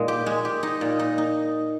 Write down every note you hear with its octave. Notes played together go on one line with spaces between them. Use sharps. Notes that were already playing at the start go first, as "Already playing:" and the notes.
Already playing: A#2 G#3 D#4
G4
G#3
G4
D#4
A#2
D#4
D#4